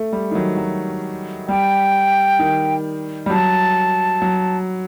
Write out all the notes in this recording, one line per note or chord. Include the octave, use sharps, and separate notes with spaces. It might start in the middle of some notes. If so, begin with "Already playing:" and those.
Already playing: A3
G3
D#3
F#3
F#3
G3 G5
D#3
G3
F#3 A5
F#3